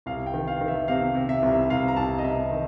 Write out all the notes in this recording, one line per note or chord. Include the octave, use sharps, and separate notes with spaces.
C2 F5
G5
D#3
F5
D#3
E5
C3 F5
C3
E5
C2
C2 F5
A#5
C2 A5
D#5
C2 E5
D#3